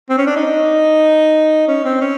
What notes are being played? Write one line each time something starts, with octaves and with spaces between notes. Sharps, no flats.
C4
C#4
D4
D#4
C#4
C4
C#4